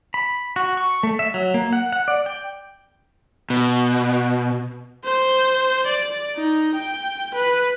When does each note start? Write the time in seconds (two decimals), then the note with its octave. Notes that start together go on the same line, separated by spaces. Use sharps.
0.14 B5
0.56 F#4
0.77 C#6
1.03 A3
1.19 E5
1.34 F#3
1.54 A#3
1.73 F#5
1.92 F#5
2.08 D5
2.26 G5
3.50 B2
5.05 C5
5.87 D5
6.36 D#4
6.76 G5
7.35 B4